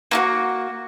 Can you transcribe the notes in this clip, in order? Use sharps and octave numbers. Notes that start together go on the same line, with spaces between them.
A#3 E4 F#4